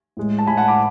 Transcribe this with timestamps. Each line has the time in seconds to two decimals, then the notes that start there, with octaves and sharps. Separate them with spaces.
0.17 A2 G#3
0.39 A5
0.47 A2 G#3 G#5 B5
0.57 F#5 A5
0.68 B5 D6